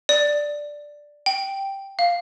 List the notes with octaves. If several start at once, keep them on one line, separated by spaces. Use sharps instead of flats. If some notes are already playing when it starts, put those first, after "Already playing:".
D5
G5
F5